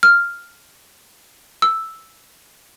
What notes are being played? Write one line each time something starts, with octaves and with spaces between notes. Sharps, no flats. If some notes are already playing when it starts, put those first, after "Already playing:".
F6
E6